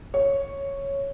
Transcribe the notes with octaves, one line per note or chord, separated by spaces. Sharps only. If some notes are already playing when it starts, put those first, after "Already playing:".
C#5